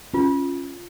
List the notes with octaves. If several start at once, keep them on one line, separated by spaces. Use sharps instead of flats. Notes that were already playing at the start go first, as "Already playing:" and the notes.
C#4 F4